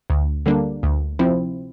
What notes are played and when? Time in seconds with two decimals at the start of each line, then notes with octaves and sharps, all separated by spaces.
0.10 D2
0.46 D3 G3 A#3 D4
0.83 D2
1.19 C3 F3 C4 E4